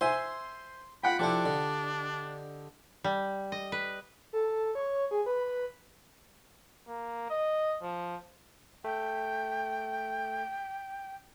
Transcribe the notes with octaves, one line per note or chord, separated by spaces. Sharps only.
C5 E5 G#5 C6
F4 F#5 G5 B5
F3 D4 E4 G4 A4 D5
D3 D#5
G3
D#5
B4
A4
C#5
G#4
B4
A#3
D#5
F3
A3 G5